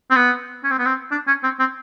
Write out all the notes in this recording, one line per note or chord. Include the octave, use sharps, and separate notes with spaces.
C4
B3
C#4
C4
B3
C4
D4
C#4
C4
C4